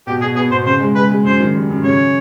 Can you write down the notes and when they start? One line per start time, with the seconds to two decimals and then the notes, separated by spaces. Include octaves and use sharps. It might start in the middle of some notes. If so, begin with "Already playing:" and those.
0.07 B2 G4
0.21 B2 G#4
0.35 B3 G#4
0.51 B2 C5
0.66 C#3 C5
0.80 G#3
0.95 G#3 B4
1.10 G#3
1.24 F#2 C5
1.40 D#3
1.55 G3
1.70 F#2
1.83 C#3 C#5